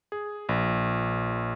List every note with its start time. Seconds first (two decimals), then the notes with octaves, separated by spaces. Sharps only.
0.12 G#4
0.49 A#1